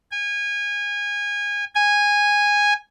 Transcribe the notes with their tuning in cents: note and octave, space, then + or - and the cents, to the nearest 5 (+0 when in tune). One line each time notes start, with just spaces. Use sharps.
G#5 -25
G#5 -10